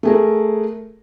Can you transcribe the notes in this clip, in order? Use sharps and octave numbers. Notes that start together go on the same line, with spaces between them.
A3 G#4 A#4